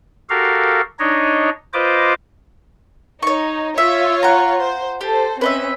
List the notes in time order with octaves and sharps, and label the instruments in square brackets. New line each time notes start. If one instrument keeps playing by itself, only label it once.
[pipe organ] F#4 G4 A4 A#4 F5
D4 D#4 C#5 D#5
F4 B4 C5 D#5 D6
[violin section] D#4 [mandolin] C#5 C#6
[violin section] F4 C#5 [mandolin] E5
[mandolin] F#5 A#5
[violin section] C5
[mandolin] G4 [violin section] A4 C5
[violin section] C4 C#4 [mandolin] B4 D#5 E5